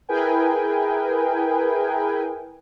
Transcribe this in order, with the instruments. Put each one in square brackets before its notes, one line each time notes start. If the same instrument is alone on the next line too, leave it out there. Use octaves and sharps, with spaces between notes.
[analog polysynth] E4 G#4 A#4 B4 G5 G#5